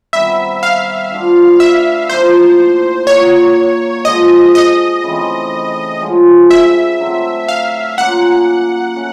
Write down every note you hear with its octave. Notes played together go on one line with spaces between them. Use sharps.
C3 D#3 G3 B3 E5
F5
D3 F3 A3 D4
E5
A2 F3 A#3 C5
A#2 F#3 A#3 C#5
D3 F3 G#3 D#5
D#5
C#3 E3 A3 C4
D3 F3 G#3 C#4
E5
D3 F#3 A3 C4
F5
F#3 A#3 C#4 F4 F#5
A3 C#4